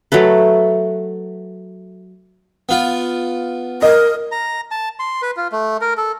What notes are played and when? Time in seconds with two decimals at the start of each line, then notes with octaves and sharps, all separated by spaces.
0.12 F#3 A3 A4 B4
2.69 B3 F4
3.82 A#4 D#5
4.32 A#5
4.71 A5
5.00 C6
5.22 B4
5.37 F4
5.52 A3
5.81 A#4
5.98 A4